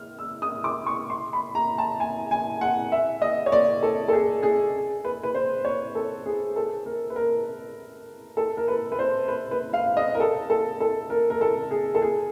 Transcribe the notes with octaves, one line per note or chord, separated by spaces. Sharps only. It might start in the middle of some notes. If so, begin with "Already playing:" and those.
Already playing: F6
E6
D#6
D6
C#6
C6
B5
A#5
A5
G#5
G#5
F#5
E5
D#5
C#5
D5
A4
A4
G#4
G#4
B4
B4
C5
C#5
A4
G#4
A4
A#4
B4
A#4
A4
A#4
B4
B4
C5
B4
B4
F5
D#5
A#4
A4
A4
A4
A#4
A#4
A4
G#4
A4
G#4